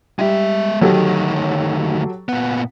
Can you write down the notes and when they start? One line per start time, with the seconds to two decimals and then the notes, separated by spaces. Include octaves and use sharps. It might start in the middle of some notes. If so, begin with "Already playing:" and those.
0.19 G3 G#3 E5
0.81 D2 D#3 F#3 G4 A4
2.29 A#2 B3